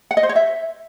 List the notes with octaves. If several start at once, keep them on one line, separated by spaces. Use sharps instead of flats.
F#5
D#5
C5
C#5
E5